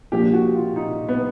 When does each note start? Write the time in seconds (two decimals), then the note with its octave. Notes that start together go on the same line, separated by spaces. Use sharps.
0.12 A#1 A#2 F3 G4
0.33 F#4
0.55 F4
0.76 D#4
1.08 B3